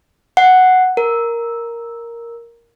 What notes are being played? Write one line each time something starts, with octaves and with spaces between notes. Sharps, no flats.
F#5
A#4